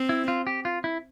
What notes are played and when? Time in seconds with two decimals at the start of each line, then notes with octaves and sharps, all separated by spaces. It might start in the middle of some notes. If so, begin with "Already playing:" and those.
Already playing: C4
0.09 E4
0.28 F4
0.47 G4
0.65 F4
0.84 E4